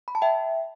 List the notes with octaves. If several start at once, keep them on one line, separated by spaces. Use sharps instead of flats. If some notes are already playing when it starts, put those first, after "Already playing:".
B5
A5
E5 G5